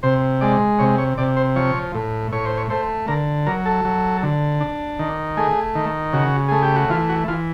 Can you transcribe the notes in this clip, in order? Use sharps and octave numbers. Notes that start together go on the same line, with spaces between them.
C3 C5
G#3 D5
C3 C#5
C#5
C3 D5
C5
F3 C#5
A2
A2 C#5
C5
C#5
A3 C5
D3 A#4
F#3 A#4
A4
F#3
D3
D4
D#3
A3 G#4
D#3
C#3 F#4
A3 G#4
G4
F#4
E3 F4
F#4
E3 F4